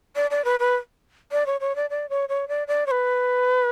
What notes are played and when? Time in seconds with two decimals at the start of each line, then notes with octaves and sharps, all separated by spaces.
0.16 D5
0.31 D5
0.45 B4
0.60 B4
1.32 D5
1.46 C#5
1.61 C#5
1.76 D5
1.90 D5
2.09 C#5
2.29 C#5
2.48 D5
2.68 D5
2.87 C#5
2.91 B4